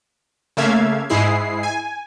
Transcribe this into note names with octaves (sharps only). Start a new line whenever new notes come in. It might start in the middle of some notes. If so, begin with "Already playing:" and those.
C#3 A3 A#3 E5 F5 G#6
G#2 G#3 E4 G#4 C7
G#5